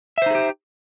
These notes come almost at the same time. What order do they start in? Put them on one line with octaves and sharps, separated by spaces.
E5 C5 D#4 G#4 G4